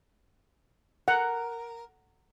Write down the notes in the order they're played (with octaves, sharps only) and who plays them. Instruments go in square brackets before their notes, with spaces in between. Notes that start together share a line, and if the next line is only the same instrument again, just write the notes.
[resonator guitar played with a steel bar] A#4 [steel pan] F#5